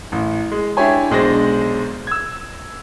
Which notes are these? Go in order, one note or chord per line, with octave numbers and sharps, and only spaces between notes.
A1
G#3
D4 E4 G4 C#5 G#5
B1 G#3 D4 C5 A#6
E6 G#6